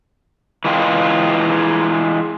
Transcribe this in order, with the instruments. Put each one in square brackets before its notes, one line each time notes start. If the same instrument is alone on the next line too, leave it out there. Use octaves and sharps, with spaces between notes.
[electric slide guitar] E3 G#3 F4 G5